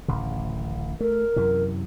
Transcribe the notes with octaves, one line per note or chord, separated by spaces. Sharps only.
D1 A1 C#3
A3 A#4
F#2 C3 E3